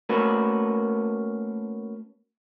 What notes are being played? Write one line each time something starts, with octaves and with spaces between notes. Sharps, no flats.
A3 A#3 C#4 F#4 A#4 B4